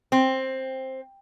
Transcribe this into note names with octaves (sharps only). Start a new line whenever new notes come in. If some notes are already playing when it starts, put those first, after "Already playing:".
C4